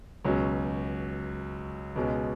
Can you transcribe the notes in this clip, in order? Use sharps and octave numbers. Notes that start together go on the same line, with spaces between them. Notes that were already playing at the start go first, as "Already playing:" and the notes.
C#2 B2 F#3 C#4
C#2 B2 G#3 C#4